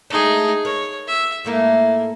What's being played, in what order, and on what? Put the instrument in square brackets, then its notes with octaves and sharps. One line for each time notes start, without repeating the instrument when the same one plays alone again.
[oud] G#3 A3 D4 [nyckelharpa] D#4 G#4
[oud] A#4 [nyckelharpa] C#5
[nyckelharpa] E5
[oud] G#2 A3 E4 [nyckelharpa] A#3